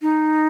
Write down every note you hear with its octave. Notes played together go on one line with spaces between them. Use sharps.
D#4